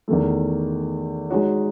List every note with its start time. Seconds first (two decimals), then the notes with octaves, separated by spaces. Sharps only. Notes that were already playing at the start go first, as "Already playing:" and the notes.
0.08 E2 D#3 A3
1.30 G#3 D#4 F#4 C#5